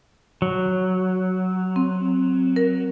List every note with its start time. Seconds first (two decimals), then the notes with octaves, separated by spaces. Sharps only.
0.42 F#3
1.76 C4
2.56 A#4